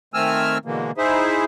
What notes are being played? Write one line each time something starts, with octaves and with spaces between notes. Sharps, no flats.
D#3 A3 C4 G#5 E6 F6
B2 D3 E3 G#3 A#3
D#4 E4 G#4 C5 E5